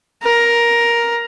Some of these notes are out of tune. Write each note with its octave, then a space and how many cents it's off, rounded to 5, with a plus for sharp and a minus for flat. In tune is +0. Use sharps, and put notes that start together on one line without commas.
A#4 +10